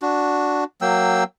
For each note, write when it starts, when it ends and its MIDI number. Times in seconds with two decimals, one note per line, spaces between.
0.02 0.64 62
0.02 0.64 66
0.82 1.24 54
0.82 1.24 58
0.82 1.24 79
0.82 1.24 88